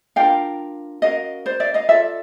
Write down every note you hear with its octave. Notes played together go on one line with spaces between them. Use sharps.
D4 F4 A#4 F5 G5
C#4 F#4 A#4 D#5 F5
C5 D5
D5 E5
D#5 F5
F4 A4 D5 E5